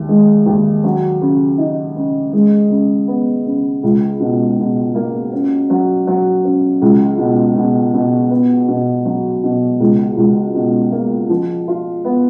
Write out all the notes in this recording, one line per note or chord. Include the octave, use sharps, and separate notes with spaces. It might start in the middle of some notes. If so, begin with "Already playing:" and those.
Already playing: D#2
G#3
D#2
F#3
C#3
D#4
C#3
G#3
C#3
B3
C#3
C#2
B2
B2
A#3
C#4
F#3
F#3
C#4
C#2
B2
B2
B2
B3
B2
F#3
B2
C#2
C#2
B2
A#3
F3
F4
B3